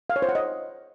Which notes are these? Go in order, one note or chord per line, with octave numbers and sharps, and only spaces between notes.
F5
C#5
C5
F#5
D#5